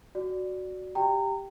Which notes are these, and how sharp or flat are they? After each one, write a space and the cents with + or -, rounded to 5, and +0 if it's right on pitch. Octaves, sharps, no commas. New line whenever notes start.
F#4 +0 D5 +0
G4 +0 G5 +0 A#5 -25